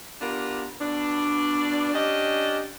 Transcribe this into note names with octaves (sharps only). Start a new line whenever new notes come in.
B3 D4 F4 G4 A#4
B2 B3 D4
C#4 D4 G4 D#5